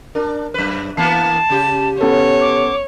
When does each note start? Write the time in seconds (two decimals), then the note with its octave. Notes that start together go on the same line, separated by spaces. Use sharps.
0.15 D4 A#4
0.54 F#2 B4
0.97 E3 A#3 B3 A5 C7
1.50 C#3 G4
2.01 B3 C#4 A4 C#5
2.41 D6